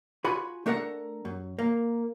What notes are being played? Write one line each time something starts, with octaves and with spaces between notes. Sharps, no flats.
F4 F#4 G#5 B5
A3 D4 A4 A#4 F#5
F#2
A#3